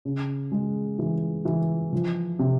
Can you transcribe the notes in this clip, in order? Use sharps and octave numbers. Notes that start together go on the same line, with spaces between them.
C#3
G#3
E3
E3
F3
C3